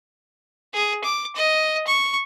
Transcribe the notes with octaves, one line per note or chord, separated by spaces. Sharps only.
G#4
D6
D#5
C#6